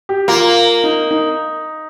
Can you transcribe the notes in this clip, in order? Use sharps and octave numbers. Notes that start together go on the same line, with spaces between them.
G4
A#3 F4
D#4
D#4